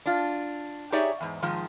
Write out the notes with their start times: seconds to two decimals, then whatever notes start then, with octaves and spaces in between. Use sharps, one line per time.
0.06 D4 F4
0.92 D#4 G4 G#4 C#5 D5 E5
1.21 E2 G#2
1.42 G#2 D#3 F3 G#3